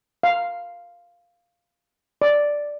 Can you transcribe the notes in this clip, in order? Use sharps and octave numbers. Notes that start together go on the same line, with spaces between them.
F5
D5